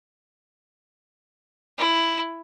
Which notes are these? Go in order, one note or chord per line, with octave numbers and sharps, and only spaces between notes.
E4